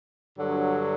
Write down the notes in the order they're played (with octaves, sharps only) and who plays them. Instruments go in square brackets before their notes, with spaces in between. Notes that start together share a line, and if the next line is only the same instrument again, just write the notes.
[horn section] G2 D3 F#3